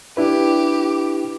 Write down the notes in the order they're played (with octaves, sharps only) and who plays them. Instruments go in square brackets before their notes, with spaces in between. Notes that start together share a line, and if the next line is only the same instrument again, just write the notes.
[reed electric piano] D4 E4 B4 [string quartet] G4